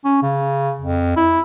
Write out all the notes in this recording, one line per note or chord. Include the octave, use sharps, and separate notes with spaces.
C#4
C#3
F2
E4